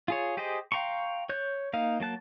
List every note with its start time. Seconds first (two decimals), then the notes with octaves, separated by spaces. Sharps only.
0.08 F4 G#4 C#5
0.37 G4 G#4 C5 D#5
0.72 F5 G5 A#5 C6 C#6
1.29 C#5 F#6 G6
1.73 A#3 D#4 F5 F6
2.00 F#3 A#3 A5 F#6